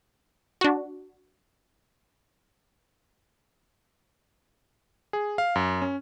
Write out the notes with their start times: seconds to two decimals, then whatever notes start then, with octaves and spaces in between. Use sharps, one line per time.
0.61 D4 F#4
5.13 G#4
5.38 F5
5.56 F#2
5.82 C#4